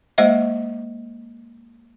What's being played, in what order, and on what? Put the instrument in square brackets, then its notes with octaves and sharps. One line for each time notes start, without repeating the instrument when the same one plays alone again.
[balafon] G#3 A#3 C5 D#5 E5